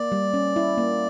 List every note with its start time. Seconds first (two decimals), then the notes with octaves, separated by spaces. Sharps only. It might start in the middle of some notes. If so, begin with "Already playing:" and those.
Already playing: A#3 D5
0.12 G3
0.33 C#4
0.56 E4
0.78 A#3